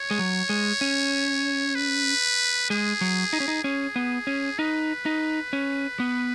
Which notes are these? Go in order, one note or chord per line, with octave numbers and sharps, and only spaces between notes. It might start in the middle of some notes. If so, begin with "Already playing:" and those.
Already playing: C#5
G#3
F#3
G#3
C#4
B4
G#3 G#4
F#3
D#4
C#4
D#4
C#4 G#4
B3
C#4
D#4 B4
D#4
C#4
B3